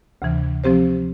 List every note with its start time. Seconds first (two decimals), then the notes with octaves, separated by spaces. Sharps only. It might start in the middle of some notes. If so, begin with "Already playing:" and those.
0.22 D2 C3 E3
0.64 F3 C4 G4 C5